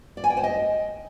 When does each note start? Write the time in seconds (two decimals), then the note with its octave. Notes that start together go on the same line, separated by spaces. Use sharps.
0.17 D5
0.24 G#5
0.30 G5
0.37 C5
0.44 D#5